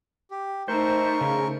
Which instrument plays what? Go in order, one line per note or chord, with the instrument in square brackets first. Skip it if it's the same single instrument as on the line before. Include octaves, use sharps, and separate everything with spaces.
[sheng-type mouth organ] G4
[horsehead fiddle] A3 D#4 [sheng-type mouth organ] A#4 C#6 [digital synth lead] C5
[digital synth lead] C#3